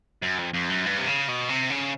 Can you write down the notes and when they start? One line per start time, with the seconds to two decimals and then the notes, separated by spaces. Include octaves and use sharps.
0.22 F#2
0.39 F2
0.54 F2
0.70 F#2
0.86 G2
0.97 C3
1.07 C#3
1.28 B2
1.49 C3
1.70 C#3